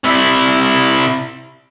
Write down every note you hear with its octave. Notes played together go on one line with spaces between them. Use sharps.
C3 E4